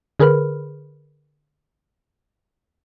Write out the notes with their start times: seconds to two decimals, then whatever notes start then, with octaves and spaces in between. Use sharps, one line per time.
0.20 D3 G#4 A#4 B4 B5 F6